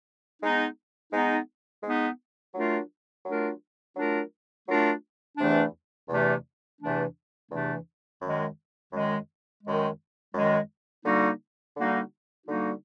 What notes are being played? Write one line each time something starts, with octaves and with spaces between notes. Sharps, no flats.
G#3 B3 D#4
G#3 B3 D#4
G#3 B3 D#4
F#3 A3 D4 F4 A#4
F#3 A3 D4 F4 A#4
F#3 A3 D4 F4 A#4
F#3 A3 D4 F4 A#4
E2 C3 E3 A3 D4
E2 C3 E3 A3 D4
E2 C3 E3 A3 D4
E2 C3 E3 A3 D4
F#2 D#3 G#3
F#2 D#3 G#3
F#2 D#3 G#3
F#2 D#3 G#3
D3 G3 A#3 D#4 F#4
D3 G3 A#3 D#4 F#4
D3 G3 A#3 D#4 F#4